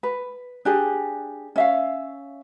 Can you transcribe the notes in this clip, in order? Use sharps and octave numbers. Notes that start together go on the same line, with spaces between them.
B4
D4 G4 G#4
C#4 E5 F5